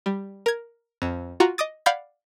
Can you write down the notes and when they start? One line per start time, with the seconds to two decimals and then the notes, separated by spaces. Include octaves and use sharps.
0.06 G3
0.46 A#4 G#6
1.02 F2
1.40 F4 F#4 A#5
1.58 D#5 D6 D#6 A6
1.86 D5 F5 F#5 B5 G6 G#6